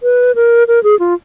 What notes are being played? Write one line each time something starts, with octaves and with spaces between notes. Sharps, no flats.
B4
A#4
A#4
G#4
F4